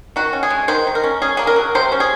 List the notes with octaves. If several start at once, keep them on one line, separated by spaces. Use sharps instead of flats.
D#3 F#4
C#4
G#4
G#3
D#3 C5
D#3
A#4
C#4
C#4 G#4
A#3 G#4
A#4
F#3
C3 C5
C#4
G#4